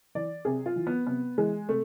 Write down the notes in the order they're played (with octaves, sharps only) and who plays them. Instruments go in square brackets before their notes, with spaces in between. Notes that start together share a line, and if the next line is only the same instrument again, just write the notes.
[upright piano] E3 D5
C3 G#4
F4
E3
B3
C3 B3
E3 G#3
C3 A3